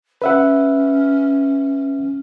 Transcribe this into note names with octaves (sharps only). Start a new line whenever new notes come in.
C#4 B4 E5 F#5